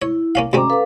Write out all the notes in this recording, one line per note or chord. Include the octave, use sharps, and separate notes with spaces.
E4 C#5
A#3 C#4 F5
D2 G#3 C4 C#4 A#5 D6
A4 B4 F5